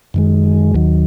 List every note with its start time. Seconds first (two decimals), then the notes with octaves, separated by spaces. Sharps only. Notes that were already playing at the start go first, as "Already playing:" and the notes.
0.14 F#2 D#3 G#3
0.74 D#2 D#3 F#3